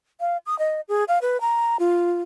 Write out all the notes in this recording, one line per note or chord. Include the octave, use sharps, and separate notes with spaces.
F5
D#6
D#5
G#4
F5
B4
A#5
F4